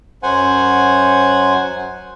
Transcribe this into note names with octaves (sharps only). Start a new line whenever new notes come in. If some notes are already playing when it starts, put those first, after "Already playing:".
F#2 F#3 C5 F#5 G#5